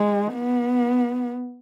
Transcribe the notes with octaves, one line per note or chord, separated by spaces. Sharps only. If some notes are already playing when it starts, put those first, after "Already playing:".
Already playing: G#3
B3